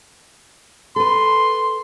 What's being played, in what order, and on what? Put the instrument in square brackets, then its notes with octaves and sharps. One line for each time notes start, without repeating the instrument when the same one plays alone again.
[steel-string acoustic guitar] A4 B4 [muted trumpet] C6